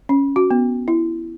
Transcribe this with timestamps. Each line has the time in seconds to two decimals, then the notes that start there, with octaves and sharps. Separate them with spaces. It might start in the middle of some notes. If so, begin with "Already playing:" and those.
0.09 C#4
0.36 F#4
0.51 B3
0.88 E4